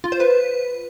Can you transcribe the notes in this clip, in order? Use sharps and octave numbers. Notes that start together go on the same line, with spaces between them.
F4
C5
B4